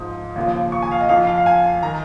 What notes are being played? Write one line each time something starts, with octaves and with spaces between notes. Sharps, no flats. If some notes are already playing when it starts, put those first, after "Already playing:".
Already playing: G#2 F3 D#6
D#2 C#3 F3
C#6
G#5
F5
D#5
F2 F3 F5
F5
F5
G#5
D#3 A#5